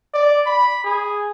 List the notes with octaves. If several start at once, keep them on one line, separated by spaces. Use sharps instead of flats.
D5
B5
G#4